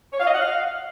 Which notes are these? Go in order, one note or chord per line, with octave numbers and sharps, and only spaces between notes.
C#5
F5
D#5
F#5
F5